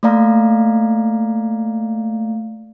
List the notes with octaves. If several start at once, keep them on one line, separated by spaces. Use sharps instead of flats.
A3 A#3 D5 F5 A#5